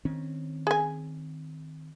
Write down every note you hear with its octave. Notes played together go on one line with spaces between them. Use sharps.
D#3 C4 C#4
G#4 G#5